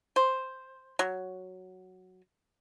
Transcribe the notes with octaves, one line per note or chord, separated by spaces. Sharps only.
C5
F#3